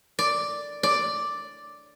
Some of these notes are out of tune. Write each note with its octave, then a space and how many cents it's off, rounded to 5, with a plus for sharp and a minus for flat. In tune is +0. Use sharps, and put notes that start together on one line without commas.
D5 +0
D5 +0